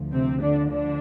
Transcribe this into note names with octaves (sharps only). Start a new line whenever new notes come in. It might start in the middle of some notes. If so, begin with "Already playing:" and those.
Already playing: D2 F3
C3 C4
D3 D4
D3 D4